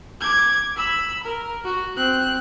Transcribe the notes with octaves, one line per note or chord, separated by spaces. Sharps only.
D6 G#6
B5 E6
A#4
F#4
C4 F#6